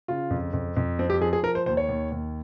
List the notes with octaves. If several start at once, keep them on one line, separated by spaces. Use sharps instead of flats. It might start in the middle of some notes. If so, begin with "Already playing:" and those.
C#3 F4
F2
F2
F2
F3 C4
G4
F3 G#4
G#4
F3 A#4
C5
D#2 C5
C#5
D#2
D#2